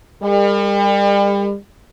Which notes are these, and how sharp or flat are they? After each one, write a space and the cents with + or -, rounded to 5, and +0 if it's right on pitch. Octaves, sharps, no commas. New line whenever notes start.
G3 +40 A#4 -45